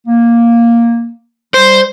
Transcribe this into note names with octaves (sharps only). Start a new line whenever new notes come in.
A#3
G3 C5